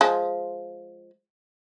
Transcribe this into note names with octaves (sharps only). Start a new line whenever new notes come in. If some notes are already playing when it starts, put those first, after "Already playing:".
F3 G#3